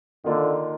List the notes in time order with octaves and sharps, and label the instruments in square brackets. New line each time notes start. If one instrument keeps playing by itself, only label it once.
[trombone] D3 [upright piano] D#3 A#3 F4